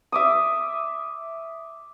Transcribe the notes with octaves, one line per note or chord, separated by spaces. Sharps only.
E5 D6 D#6